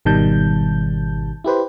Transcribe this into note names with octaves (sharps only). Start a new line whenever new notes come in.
G#1 B2 D#3 G3 A5 G6
E4 G4 B4 C5